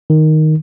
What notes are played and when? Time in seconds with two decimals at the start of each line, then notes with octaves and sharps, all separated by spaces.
0.10 D#3